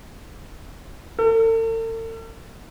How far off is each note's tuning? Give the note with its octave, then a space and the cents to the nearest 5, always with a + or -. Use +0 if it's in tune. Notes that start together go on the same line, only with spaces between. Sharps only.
A4 +45